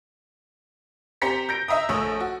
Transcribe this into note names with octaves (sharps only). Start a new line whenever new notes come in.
C4 G4 C5 A#5 B6 C#7
G6 A#6 D7
D#5 E5 A#5 D#6
A#1 A3 C#5 D#6 E6
F#4